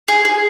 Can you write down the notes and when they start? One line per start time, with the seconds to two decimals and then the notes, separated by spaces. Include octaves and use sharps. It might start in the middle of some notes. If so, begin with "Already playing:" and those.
0.08 G#4
0.25 G#4